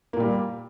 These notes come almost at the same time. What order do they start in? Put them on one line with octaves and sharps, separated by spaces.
A#3 A#2 G3